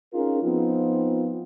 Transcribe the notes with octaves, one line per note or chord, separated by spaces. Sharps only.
C#4 D#4 F4 G#4 A#4
F3 B3 C4 D#4 F4